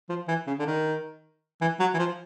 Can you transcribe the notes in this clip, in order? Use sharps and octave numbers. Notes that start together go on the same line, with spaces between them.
F3
E3
C#3
D3
D#3
E3
F#3
E3
F3